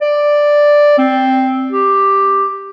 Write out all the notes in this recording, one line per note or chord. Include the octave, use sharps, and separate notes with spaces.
D5
C4
G4